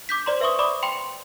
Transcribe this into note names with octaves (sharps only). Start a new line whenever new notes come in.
D6 G6 B6
C5 D5 A#5 C6
B4 E5 C6 C#6 D#6
D5 B5 D6 D#6
G5 A#5 C6 C#7 F7